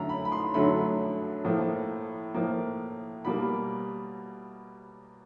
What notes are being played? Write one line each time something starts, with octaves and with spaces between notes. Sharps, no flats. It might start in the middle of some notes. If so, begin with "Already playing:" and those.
Already playing: F#2 D3 F#3 A3 A#5
B5
B5
C6
F#2 D3 F#3 A3 B5
A2 F3 A#3
A2 F3 A#3
B2 G3 A#3 B5